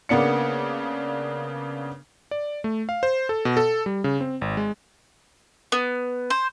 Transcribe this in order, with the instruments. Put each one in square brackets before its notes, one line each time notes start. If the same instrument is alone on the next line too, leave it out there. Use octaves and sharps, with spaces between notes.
[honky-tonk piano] C#3 A#3 B3 D4 C#7
[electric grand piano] D5
A3
F5
C5
A4
B2
A4
G3
C#3
C4
G#1
G#3
[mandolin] B3
C5